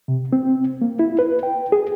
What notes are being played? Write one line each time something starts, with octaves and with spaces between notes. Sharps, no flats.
C3
C4
A#3
E4
B4
G5
G#4